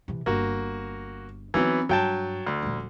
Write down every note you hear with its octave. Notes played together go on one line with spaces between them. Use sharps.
C3 E3
G1 A#3 F#4
E3 F#3 B3 C4 D#4
G2 F#3 G5 A5
D2
D#1 F3